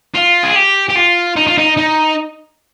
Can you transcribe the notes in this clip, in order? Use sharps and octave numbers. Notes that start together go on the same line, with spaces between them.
F4
G#4
G4
G4
F4
D#4
F4
D#4
D#4